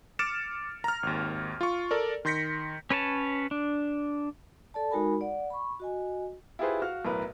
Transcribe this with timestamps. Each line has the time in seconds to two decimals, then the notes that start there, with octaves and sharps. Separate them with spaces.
0.19 D6 F6 A6 C#7 D7 E7
0.84 A#5 F6
1.03 G#1 D#2
1.61 F4 C#6
1.91 A4 A#4 D5
2.25 D#3 C6 G6 A#6 B6 C#7
2.90 C#4 B4 C#5 A5
3.51 D4
4.74 A4 D5 A5
4.91 G#3 D#4 F#4 A#4 G#5 B5
5.21 D5 F#5
5.50 B5 C#6
5.80 F#4 D#5 G#5
6.59 E4 F4 G4 G#4 B4 C5
6.82 F#4 F5 F6
7.05 B1 A2 A#4 B4